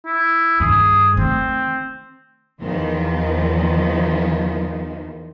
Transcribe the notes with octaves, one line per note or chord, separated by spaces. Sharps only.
E4
G2 D#3 G#4
D#3 A3 C4
E2 D#3 F3